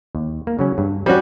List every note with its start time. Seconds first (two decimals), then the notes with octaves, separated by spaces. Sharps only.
0.15 D#2
0.47 A#3
0.59 C#3 F#3 C#4
0.78 G2
1.06 F3 G3 C#4 F#4